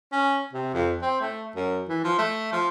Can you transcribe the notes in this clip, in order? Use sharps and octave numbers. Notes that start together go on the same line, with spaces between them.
C#4
C3
F2
C4
A3
F#2
E3
F3
A3
F3